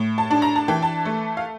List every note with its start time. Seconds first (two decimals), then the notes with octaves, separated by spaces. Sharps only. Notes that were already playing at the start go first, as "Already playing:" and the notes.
Already playing: A2
0.18 A5
0.31 D4
0.42 A#5
0.56 A5
0.68 E3 G5
0.82 A5
1.05 A3
1.37 F5